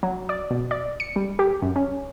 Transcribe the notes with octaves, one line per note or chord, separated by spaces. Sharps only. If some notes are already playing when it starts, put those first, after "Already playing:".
F#3
D5
B2
D5
C#7
G3
G4
F#2
C#4